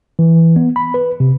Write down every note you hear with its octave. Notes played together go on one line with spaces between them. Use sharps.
E3
B3
B5
B4
C3